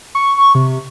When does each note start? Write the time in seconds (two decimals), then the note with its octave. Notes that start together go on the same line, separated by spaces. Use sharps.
0.15 C#6
0.55 C3